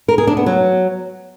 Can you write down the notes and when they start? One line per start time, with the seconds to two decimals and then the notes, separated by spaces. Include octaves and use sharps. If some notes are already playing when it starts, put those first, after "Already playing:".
0.08 A#4
0.18 G#4
0.27 D4
0.37 B3
0.46 F#3